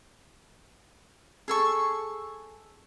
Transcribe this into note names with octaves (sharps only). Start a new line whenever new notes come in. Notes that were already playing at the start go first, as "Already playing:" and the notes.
G#4 A4 C#6